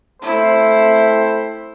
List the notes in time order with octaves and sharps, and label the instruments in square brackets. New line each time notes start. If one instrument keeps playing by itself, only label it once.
[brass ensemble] A3 C4 C5 [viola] E4